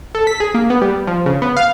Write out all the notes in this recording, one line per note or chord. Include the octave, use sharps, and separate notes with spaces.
A4
B6
G#4
A#3
B3
G3
F3
C#3
B3
F5